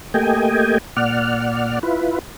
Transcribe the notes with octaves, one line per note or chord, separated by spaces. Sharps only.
A3 A#3 G4 D#5 G5 G#5
A#2 D5 F#5 F6
E4 F4 B4